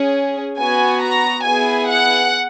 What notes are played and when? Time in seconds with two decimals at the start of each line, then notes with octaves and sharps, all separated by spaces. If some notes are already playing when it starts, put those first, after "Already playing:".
Already playing: C#4 G#4
0.58 B3 F#4 G#5
1.02 A#5
1.45 B3 E4 G#4 G#5
1.88 F#5